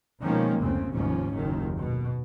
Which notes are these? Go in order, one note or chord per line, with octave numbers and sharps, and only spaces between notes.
B2 D#3 F3 G#3 A#3 C#4
F#1 D2 C#3 C4
F1 D#2 G#2 F3 C#4
F#1 D#2 D#3
B2